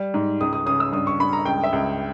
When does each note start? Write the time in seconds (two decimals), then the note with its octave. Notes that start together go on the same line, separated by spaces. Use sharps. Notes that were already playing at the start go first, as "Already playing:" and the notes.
Already playing: G3
0.14 G#2
0.41 C#2 D#6
0.53 D#6
0.66 C#3 D#6
0.80 E6
0.92 G2 D#6
1.07 C#6
1.20 G2 B5
1.33 A#5
1.46 C#2 G5
1.64 E5
1.73 C#2